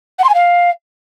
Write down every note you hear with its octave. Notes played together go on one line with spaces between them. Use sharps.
F#5
C6
G#5
F5